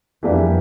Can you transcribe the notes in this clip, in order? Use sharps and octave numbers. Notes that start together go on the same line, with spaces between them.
F2 E3 G3 A#3 D4 G4